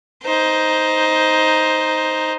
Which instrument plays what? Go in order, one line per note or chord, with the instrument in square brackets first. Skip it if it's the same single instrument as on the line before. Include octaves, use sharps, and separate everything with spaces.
[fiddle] D#4 C5